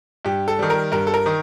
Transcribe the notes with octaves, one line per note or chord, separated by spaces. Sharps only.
G2 G4
A4
D#3 G3
A#4
G2 A#4
A4
A#4
D#3